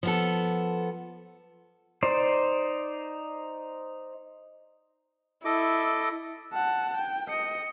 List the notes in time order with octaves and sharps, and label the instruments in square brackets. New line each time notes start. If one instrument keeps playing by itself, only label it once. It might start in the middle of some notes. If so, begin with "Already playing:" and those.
[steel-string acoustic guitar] F3 B3 A4
[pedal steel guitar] D#4 C5 D5
[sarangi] E4 [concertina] A4 D#5 D6
[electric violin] F#5 A5
G5
D#5 C#7